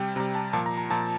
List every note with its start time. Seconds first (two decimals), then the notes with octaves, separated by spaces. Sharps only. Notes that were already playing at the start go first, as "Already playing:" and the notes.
Already playing: C3 G3 G5
0.16 C3 A#5
0.20 G3
0.35 A5
0.53 A#2 F3 A5
0.66 A#5
0.77 A#5
0.90 A#2 F3 A5